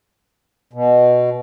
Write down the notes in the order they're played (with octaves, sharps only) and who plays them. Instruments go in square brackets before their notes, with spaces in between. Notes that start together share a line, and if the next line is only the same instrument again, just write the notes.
[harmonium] B2